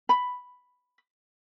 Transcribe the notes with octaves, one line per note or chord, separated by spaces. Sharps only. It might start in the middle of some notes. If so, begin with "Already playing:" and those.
B5